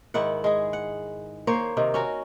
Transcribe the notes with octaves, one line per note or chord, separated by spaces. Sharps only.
G#2 D#3 E4 F#5
G#3 G#4
F#5
A#3 C5 C#5
C3 D#3
C#4 F#4 A#4